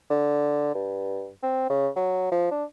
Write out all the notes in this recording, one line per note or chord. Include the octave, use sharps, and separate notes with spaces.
D3
G2
C4
C#3
F#3
F3
D4